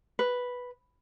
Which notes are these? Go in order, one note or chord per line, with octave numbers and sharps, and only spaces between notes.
B4